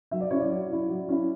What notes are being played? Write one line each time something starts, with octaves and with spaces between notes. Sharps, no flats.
F#3 E5
D5
C#4 E4 C#5
D5
F#3
C#4 E4
F#3
C#4 E4